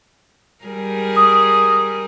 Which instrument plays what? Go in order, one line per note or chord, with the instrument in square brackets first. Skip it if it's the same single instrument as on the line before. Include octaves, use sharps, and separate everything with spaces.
[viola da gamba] G3 G#4 A#4
[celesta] D#6